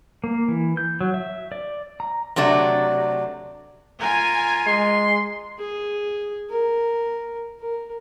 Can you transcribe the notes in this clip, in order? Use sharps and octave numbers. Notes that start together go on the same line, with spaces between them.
A#3
E3
G6
F#3
E5
D5
A#5
C3 F#3 A3 D4
F4 A#4 G#5
G#3 C6
G#4
A#4
A#4